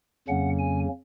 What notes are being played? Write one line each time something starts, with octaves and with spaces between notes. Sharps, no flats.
F2 C#3 F#3 A#3 C#4 F#5
G#5